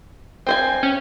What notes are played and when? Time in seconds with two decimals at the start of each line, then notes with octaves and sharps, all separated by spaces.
0.47 C4 C5 G#5
0.83 C#4